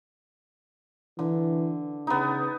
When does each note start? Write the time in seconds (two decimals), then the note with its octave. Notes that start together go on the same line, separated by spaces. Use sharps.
1.19 D3 E3
2.07 C#3 B3 D#4